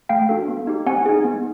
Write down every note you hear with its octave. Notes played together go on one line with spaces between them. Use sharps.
A3 F5 G5
D4 F#4 A4
B3
D#4 G4
C4 F#5 G#5
D#4 G#4
B3